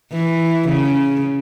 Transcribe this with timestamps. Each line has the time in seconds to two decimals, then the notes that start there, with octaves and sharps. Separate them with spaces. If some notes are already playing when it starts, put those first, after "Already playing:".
0.12 E3
0.69 C#3